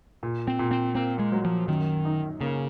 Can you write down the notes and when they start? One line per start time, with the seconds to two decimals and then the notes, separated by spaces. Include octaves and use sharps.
0.23 A#2
0.48 C4
0.59 A#2
0.71 C4
0.95 A#3 C4
1.19 G#3
1.32 F#3
1.45 F3
1.68 F#2 D#3
2.05 D#4
2.41 C#3 A#3